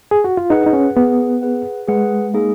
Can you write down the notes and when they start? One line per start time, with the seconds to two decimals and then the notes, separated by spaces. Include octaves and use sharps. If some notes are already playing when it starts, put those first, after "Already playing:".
0.11 G#4
0.24 F#4
0.37 F4
0.50 D#4 G#4 B4 F#5
0.66 D#4
0.73 C#4
0.96 B3 G#4 B4 F#5
1.42 G#4 B4 F#5
1.88 G#3 G#4 B4 F#5
2.34 A#3 D#4 G#4